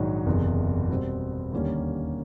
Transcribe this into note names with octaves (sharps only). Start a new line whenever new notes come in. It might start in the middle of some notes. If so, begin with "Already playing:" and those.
Already playing: A#1 G#2 D#3 F#3
F#1 E2 C3
B2 G3 C4
D#2 D3 G3 A#3 C#4